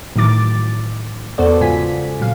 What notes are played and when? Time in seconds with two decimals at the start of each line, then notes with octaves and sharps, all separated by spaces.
0.16 A2 D#3 E3 F#3 D6 A6
1.38 E2 B3 F#4 A4 C5 D5
1.60 G#2 C#3 F4 G#5 B6
2.20 A#2 F#3 F5